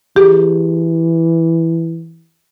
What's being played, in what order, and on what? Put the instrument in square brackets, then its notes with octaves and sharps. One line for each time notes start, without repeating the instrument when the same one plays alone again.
[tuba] E3 [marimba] G4 G#4